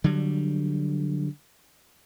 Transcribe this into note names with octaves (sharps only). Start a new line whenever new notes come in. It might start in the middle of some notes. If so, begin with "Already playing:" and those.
D3 F#3 G3